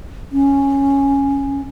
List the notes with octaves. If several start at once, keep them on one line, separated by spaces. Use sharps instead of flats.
C#4